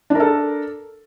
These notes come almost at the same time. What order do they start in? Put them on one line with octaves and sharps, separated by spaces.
D4 A#4 A4